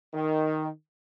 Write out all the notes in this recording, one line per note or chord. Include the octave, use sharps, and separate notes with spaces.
D#3